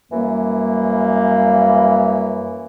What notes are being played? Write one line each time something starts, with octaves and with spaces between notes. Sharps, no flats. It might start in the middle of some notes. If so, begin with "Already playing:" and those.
F#2 E3 G3 A#3